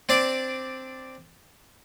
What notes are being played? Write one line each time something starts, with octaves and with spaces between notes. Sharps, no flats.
C4 D4 D5